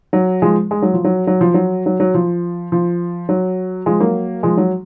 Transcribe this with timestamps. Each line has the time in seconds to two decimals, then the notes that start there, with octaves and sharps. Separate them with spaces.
0.13 F#3
0.42 F3 G#3
0.71 G#3
0.82 F#3
0.93 F3
1.04 F#3
1.27 F#3
1.41 F3
1.54 F#3
1.86 F#3
2.00 F#3
2.14 F3
2.72 F3
3.29 F#3
3.86 F3 G#3
4.00 F#3 A#3
4.43 F3 G#3
4.57 F#3